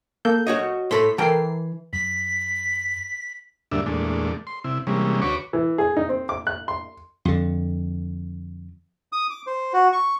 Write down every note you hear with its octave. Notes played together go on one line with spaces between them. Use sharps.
A#3 A4 G6
F#4 C#5 D#5
A2 A4 B5 C6 B6
E3 A4 A#4 G5 C7
F#2 B6
D2 G2 A#2 D4 E5
E2 A#2 G#3 A3 D4
C6
C3 E4
C3 E3 G3 G#3 A#3 C#4
D2 F#4 B4 C#5 C#6 D6
E3
G#4
D#4
C4
D6
F#6
C6
F2 D3
D#6
D6
C5
F#4
C#6